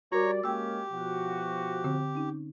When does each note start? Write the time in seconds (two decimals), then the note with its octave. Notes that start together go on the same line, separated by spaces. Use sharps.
0.12 G3 F#4 A#4 C#5 D5 A#5 C#6
0.44 G#3 A#3 C#4 G4 G5 E6
0.91 B2 F3 F#4
1.84 D3 C4
2.15 C#4 D#4